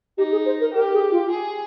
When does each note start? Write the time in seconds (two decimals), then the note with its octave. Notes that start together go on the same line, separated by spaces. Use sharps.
0.18 D#4 G4
0.32 G#4
0.46 C5
0.61 A#4
0.74 G4 A#4
0.93 G#4
1.12 F4
1.31 G#4